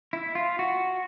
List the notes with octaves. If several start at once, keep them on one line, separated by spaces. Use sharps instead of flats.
E4
F4
F#4